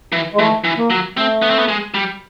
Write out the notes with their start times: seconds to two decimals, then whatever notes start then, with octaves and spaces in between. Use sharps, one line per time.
0.12 E3
0.33 G#3
0.39 E3 A3
0.64 E3
0.77 A#3
0.90 F#3
1.17 A3 C4
1.42 B3
1.50 C4
1.59 B3
1.68 G#3
1.94 G3